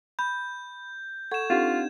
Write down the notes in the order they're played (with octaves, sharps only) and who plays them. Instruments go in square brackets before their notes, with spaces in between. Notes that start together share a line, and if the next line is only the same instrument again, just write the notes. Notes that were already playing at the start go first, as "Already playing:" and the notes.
[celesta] B5 [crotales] G6
[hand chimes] A4 C#6 [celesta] F#5 [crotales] G#6 E7
[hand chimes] C4 D4 D#4 [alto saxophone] F4 [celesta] G4 F5 F#5